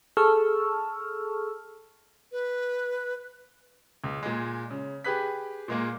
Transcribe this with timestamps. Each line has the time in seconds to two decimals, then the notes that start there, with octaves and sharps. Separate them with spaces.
0.17 G#4 A4 A5 C#6 E6 F6
2.32 B4
4.04 C#2
4.23 A#2 G#3
4.70 C#3
5.04 G4 G#4 B4 F#6 B6
5.68 A#2 G#3 A#3